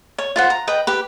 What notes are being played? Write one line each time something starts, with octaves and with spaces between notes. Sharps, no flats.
C#5
F4 C5 F#5
A#5
B4 D#5 G5
G4 B4